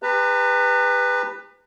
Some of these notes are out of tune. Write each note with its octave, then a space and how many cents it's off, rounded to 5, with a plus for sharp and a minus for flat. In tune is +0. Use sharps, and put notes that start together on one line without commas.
G4 +40 B4 +5 A#5 -40